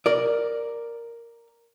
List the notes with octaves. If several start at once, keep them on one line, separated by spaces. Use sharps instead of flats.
A#4 D5